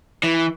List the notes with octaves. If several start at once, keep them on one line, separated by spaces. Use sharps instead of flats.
E3